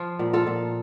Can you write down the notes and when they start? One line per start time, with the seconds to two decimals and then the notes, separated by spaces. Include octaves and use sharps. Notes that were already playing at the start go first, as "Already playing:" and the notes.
Already playing: F3 F4
0.19 A#2
0.33 F4 A4
0.47 A#2